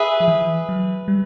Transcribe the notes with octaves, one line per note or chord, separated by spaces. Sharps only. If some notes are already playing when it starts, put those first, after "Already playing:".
Already playing: G#4 B4 E5
F3
E3
F#3
G3